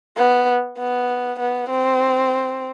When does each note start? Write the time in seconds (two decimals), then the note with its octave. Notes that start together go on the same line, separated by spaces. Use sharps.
0.17 B3
0.78 B3
1.40 B3
1.69 C4